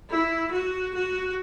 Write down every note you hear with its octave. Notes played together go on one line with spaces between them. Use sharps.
E4
F#4
F#4